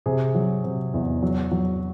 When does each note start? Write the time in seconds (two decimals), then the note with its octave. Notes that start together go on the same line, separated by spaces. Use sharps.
0.06 C3 G#4
0.35 F#3
0.64 C3
0.94 E2
1.22 F#3
1.52 F#3